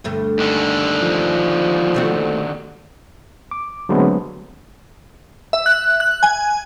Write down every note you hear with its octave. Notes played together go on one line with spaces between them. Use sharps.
D2 G2 A3
D#2 D3
F3
A3 C4 F#4
D6
D3 F#3 G#3 A3 B3 C4
E5
F#6
F#6
G#5